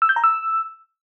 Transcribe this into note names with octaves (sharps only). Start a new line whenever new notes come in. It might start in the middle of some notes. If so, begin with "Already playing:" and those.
E6
G6
A#5
E6